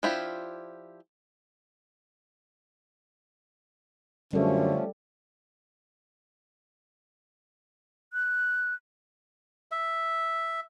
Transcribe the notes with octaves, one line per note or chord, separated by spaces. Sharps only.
F3 D4 E4 F4 G4
F#2 D3 F3 G3 A3 C#4 A4
F#6
E5